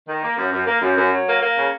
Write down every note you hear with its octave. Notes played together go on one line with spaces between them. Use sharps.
D#3
A#3
F#2
F#2
A#3
F#2
F#2
F#3
A#3
A#3
C#3